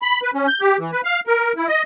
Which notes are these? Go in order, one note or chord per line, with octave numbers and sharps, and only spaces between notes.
B5
B4
C#4
G6
G4
E3
B4
F5
A#4
E4
D#5